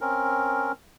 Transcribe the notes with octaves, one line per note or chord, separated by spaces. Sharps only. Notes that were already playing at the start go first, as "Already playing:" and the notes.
C4 C#4 A#4